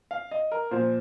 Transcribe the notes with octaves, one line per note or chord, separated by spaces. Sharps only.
F5
D#5
A#4
A#2 F3 C5